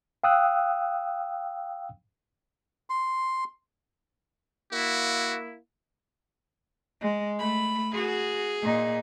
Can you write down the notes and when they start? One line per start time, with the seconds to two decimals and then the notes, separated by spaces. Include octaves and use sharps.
0.24 F5 G5 D#6 E6 F#6
2.90 C6
4.72 A#3 E4 F#4
7.01 G#3
7.39 A3 B5
7.94 F#4 G#4
8.62 A#2 D#4